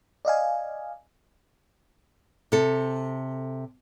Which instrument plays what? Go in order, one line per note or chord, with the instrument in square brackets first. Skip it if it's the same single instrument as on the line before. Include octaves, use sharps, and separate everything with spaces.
[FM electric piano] D5 D#5 F5 G#5
[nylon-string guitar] C3 A4